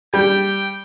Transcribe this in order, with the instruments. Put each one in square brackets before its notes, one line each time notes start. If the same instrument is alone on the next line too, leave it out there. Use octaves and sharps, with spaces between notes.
[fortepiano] G3 [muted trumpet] G5